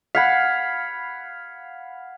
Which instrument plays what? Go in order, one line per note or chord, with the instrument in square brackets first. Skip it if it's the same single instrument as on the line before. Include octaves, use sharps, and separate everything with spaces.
[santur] F5 F#5 B5 [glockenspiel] G#6 B6